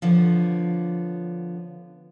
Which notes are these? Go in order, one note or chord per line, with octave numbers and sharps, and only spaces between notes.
D3 F3 B3 D4 C#5